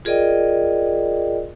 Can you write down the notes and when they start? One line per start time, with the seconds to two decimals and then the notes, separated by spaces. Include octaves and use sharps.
0.05 F4 G#4 A#4 D5 D#5 G5